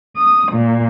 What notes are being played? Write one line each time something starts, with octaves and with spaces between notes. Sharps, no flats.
D#6
A#2